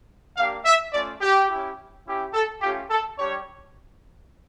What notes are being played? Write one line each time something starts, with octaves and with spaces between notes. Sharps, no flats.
A#3 D4 G4 F5
E5
A3 C#4 F4 D5
G4
C#4 E4 G4
C#4 E4 G4
A4
A3 C#4 F4 G4
A4
G3 D4 G4 C#5